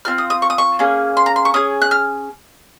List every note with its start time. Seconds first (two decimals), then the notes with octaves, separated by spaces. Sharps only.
0.05 C4 F4 F6
0.18 D#6
0.30 D#6
0.42 C#6
0.50 D#6
0.58 C#6
0.79 A#3 C#4 G#4
1.17 C6
1.26 A#5
1.36 C6
1.45 C#6
1.54 C#4 G#4 D#6
1.82 F#6
1.91 F6